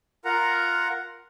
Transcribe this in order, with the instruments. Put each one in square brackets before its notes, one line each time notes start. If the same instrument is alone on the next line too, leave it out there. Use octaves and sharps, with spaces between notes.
[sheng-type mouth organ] F4 A#4 F#5 A#5